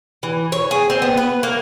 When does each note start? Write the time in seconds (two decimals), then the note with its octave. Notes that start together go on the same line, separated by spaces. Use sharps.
0.23 E3
0.52 C#5
0.71 G#4
0.90 C4
1.02 B3
1.17 B4
1.43 A#3